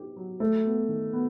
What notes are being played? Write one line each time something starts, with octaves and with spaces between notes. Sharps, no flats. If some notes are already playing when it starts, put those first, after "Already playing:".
Already playing: D#4 G4
F#3
F#3 A3
B3
D#3
B3